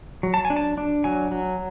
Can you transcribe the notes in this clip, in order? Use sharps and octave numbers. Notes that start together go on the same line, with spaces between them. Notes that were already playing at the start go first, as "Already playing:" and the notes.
F#3
A5
G#5
D4
A5
D4
F#3 G#5
F#3